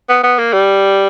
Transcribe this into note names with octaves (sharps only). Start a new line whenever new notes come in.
B3
B3
A#3
G3